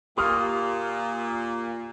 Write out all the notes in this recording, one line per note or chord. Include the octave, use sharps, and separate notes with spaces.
A#2 A#3 G4 C6 C#6 D#6 F6